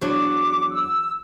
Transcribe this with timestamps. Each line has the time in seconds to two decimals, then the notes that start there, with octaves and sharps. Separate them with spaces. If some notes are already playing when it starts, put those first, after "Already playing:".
0.01 E2 F#3 D4 D6
0.71 E6